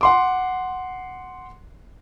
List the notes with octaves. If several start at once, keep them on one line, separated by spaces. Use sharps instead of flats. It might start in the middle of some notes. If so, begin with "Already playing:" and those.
F#5 C6 D6